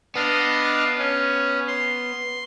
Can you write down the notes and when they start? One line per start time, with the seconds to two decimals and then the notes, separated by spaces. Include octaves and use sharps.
0.16 B3 D4 D#5 F5
0.98 C#4
1.68 C6